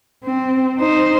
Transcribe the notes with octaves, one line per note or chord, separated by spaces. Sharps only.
C4
D#4 C5